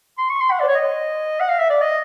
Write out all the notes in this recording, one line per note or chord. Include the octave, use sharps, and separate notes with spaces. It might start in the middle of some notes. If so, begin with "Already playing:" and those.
C6
C#6
C6
F#5
D5
C5
C#5
D#5
F#5
F5
E5
D5
D#5